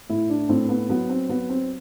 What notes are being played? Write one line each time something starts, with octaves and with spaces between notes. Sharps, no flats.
A2 E4
D4
A2 C4
B3
F#3 B3
C4
F#3 B3
C4